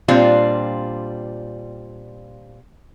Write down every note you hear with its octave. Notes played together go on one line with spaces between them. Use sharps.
A#2 G3 C4 D4 F4